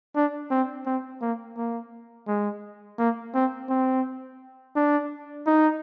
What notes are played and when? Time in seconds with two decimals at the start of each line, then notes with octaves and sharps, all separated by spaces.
0.16 D4
0.51 C4
0.86 C4
1.21 A#3
1.57 A#3
2.28 G#3
2.99 A#3
3.34 C4
3.69 C4
4.76 D4
5.47 D#4